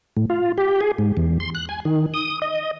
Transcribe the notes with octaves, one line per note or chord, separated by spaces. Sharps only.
A2
F4
G4
G#4
G#2
E2
C6
F#6
G#5
D#3
D#6
D#5